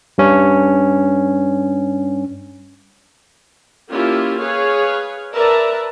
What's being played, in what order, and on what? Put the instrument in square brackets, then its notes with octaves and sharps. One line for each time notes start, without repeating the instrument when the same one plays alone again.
[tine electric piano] G2 C#4
[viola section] A#3 C#4 E4 F4 G4
G#4 B4 C#5 F5
A#4 B4 D5 E5 A5 A#5